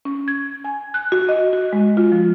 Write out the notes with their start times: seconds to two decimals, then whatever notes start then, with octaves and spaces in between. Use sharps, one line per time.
0.05 C#4
0.28 G#6
0.64 G#5
0.94 F#6
1.12 F#4
1.29 D#5
1.53 F#4
1.73 G#3
1.97 F4
2.12 F3